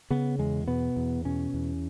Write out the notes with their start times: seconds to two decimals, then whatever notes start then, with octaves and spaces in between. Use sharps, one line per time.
0.10 C#3 B3
0.39 E2 G#3
0.67 B2 B3
0.96 E2
1.25 B2 C#4
1.54 E2